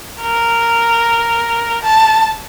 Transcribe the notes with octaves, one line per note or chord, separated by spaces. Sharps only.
A#4
A5